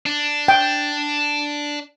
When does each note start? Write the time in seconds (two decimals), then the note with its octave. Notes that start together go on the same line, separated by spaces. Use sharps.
0.06 D4
0.48 G5